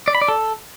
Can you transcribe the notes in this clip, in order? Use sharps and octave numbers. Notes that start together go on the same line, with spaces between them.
D5
B5
D5
A4